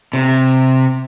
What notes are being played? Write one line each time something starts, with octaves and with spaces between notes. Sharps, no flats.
C3